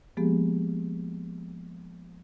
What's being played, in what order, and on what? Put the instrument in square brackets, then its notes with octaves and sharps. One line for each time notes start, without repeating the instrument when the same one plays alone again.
[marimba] F3 G#3 A#3 B3 G4 G#4